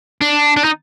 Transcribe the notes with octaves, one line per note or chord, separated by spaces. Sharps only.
D4
D4
D#4